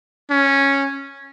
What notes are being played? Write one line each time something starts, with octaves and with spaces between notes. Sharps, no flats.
C#4